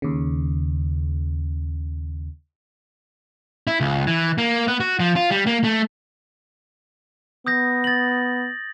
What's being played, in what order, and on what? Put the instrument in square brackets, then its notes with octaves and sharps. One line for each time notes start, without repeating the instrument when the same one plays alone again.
[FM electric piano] D#2 C#3
[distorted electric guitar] E4
C#2
E3
A#3
B3
F#4
F3
F4
G3
A#3
A3
[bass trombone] B3 [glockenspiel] D#6 G6 A#6
[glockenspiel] A6 F#7